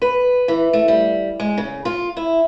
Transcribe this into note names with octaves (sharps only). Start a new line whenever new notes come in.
B4
E3
A3
G3
G#3
C#3
F4
E4